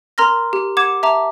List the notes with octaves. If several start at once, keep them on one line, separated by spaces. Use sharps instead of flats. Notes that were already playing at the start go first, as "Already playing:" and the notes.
A#4 A#5 C6 F6 A#6
G4
F#5 D6 G#6 E7
E5 A5 A#5 D6